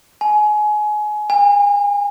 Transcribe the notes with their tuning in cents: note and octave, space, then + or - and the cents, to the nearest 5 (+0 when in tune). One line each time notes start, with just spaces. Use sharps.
G#5 +25
G#5 -35